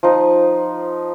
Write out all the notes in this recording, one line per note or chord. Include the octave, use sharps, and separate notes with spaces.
F3 D#4